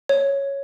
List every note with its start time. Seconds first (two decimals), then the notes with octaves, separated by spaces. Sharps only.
0.09 C#5